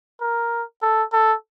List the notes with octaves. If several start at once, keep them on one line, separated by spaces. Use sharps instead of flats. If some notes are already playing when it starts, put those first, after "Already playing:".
A#4
A4
A4